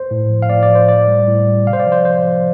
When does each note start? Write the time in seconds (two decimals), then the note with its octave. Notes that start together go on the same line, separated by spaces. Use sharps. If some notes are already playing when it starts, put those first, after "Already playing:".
Already playing: C5
0.11 A2
0.30 F3
0.42 F5
0.50 A2 D5
0.63 D5
0.69 F3
0.75 C5
0.88 A2 D5
1.08 G3
1.27 A2
1.47 G3
1.67 C3 F5
1.73 C5
1.80 D5
1.86 F3
1.92 C5
2.05 C3 C5
2.25 F3